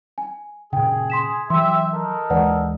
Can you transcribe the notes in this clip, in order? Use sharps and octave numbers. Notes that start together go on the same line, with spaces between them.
G#5
A#2 C#3 G#4 G5
C6 B6 E7
E3 F#3 G4 E5 C6
D#4 A4 A#4
D#2 E3 G#3 B4 D5 F#5